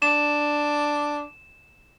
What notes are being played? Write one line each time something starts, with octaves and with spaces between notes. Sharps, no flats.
D4 E7